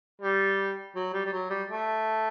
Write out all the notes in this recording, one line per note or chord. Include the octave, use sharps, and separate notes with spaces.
G3
F#3
G3
G3
F#3
G3
A3